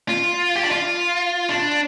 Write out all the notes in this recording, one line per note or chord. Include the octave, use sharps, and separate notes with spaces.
F4
G4
D4
F4
D4